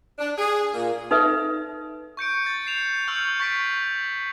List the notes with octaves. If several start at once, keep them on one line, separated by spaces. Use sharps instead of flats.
D4
G#4
A#2
D#4 A4 B4 E5
C#6 G6 C#7 D7
A6
C7 C#7 E7 F7
C#6 E6 F6 G6 C#7 F#7
C#6 A6 B6 C7 D7